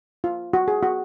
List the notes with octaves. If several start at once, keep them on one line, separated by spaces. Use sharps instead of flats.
F4
F#4
G#4
F#4